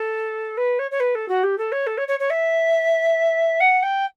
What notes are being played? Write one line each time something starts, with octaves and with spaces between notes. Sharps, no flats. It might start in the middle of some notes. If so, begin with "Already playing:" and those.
Already playing: A4
B4
C#5
C#5
B4
A4
F#4
G4
A4
C#5
A4
C#5
C#5
C#5
E5
F#5
G5